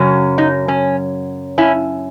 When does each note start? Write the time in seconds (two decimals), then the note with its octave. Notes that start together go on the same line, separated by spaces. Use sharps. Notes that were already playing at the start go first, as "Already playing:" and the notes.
Already playing: F#2 C#3 F#3 C#4
0.38 D#4
0.68 C#4
1.58 C#4 E4